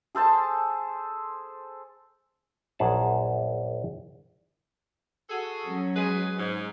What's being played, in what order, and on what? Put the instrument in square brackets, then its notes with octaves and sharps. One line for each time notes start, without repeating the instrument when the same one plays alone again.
[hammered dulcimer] G#4 A4 C5 A5
[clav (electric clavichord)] A#1 F#2 G#4 F#5 A5
[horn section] F#4 G#4 A4
[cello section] F#3 C#4
[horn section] G#3 G#4 B4
G#2